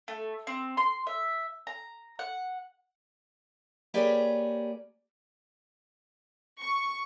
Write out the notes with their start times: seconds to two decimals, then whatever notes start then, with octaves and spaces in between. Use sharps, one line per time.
0.08 A3
0.47 C4
0.77 C6
1.07 E5
1.67 A#5
2.19 F#5
3.94 A#3 G4 G#4 B4 C#5 D5
6.59 C#6